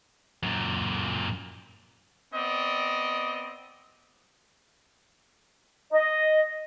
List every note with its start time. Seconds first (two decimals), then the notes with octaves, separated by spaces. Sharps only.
0.43 F#2 A#2
2.34 B3 C4 D5 D#5
5.92 D#5